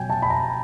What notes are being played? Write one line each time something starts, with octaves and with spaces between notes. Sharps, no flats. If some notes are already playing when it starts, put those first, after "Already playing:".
Already playing: B2 F#3 G5 G#5
A5
B5
A#5